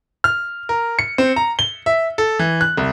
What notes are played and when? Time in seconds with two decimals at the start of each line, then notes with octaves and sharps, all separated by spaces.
0.24 F6
0.69 A#4
0.99 C#7
1.18 C4
1.36 A#5
1.59 G7
1.86 E5
2.18 A4
2.39 E3
2.61 F#6
2.77 C2